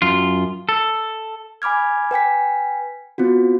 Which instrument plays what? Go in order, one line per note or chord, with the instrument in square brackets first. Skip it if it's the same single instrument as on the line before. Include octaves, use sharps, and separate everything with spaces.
[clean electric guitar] F#2 F4
A4
[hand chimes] G#5 B5 D6 F6 G#6
B4 G5 G#5 B6
B3 C4 F4 F#4